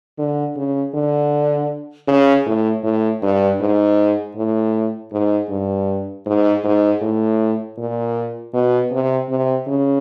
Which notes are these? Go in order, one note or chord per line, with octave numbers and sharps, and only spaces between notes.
D3
C#3
D3
C#3
A2
A2
G2
G#2
A2
G#2
G2
G#2
G#2
A2
A#2
B2
C3
C3
C#3